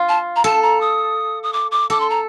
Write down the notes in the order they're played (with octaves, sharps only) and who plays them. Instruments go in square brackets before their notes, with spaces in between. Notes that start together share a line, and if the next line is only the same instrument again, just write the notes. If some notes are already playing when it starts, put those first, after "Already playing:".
Already playing: [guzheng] F4
[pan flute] A5
A#5
[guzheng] A4 [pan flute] A5
[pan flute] A#5
D#6
D#6
D6
D6
[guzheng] A4 [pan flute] D6
[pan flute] C6
A#5